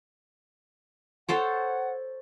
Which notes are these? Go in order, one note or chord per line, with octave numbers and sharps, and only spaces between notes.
A4 C5 C#5 F#5